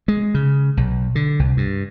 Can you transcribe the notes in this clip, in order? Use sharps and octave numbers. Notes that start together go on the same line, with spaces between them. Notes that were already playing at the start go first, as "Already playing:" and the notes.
G#3
C#3
B1
D3
C2
G2